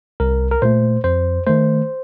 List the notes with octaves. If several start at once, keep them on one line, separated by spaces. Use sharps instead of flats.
C2 A#4
A#4
A#2 A3 C5
F2 C5
D#3 A3 C5